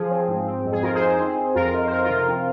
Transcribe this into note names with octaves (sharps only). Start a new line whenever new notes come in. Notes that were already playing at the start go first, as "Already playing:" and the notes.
Already playing: F3 G#4
C4
G#2
C4
F2
G#4
D#4 F4 A#4
G#4 C5
D#4
G#4
C4
C4
F2 F4 A#4
D#4
C5
F2 F4 A#4
F4 A#4
C3
F4 A#4
C4